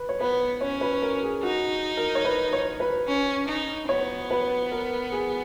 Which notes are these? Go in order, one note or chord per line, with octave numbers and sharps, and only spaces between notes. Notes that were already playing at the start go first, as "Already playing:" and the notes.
Already playing: B4
C#5
B3 B4
C#4 C#5
B4
A#4
G#4
D#4 F#4
A#4
C#5
B4
C#5
B4
C#4
D#4
B3 C#5
B4
A#4
G#4